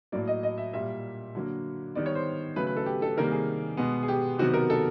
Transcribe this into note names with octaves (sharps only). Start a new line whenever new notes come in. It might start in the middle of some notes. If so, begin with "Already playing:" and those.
A2 F#3 A#3 D5
D#5
D#5
E5
A#2 G3 A#3 E5
D3 F#3 A#3
D#3 G3 B3 D5
C#5
C5
C#3 F#3 A3 B4
B4
A4
G4
A4
C3 D#3 G3 A#3 A#4
G#4
B2 G#3 B3
G#4
G4
C3 D#3 F#3 B3 F#4
A#4
A4